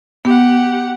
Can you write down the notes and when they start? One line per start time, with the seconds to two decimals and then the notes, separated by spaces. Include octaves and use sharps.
0.25 B3 G4 F#5